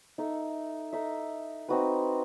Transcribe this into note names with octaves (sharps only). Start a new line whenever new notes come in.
D#4 A4 E5
D#4 A4 E5
C4 D#4 F#4 B4